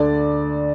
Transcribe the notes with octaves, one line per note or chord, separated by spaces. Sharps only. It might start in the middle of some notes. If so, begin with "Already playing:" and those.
Already playing: D2 D3 D5